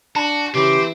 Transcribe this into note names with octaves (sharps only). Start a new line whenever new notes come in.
D4 F#4 A5
C#3 E3 C4 G4